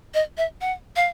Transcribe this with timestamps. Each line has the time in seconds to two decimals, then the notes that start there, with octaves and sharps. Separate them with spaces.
0.14 D#5
0.38 E5
0.61 F#5
0.96 F5